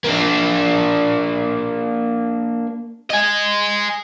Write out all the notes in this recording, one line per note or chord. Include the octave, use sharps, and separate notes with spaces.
A#3 D4
D#5 G#5